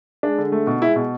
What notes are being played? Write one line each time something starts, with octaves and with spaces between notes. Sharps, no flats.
G#3 D4
D3
A3
B2
G#3 E4
B2